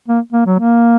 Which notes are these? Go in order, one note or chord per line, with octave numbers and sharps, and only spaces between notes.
A#3
A#3
F#3
A#3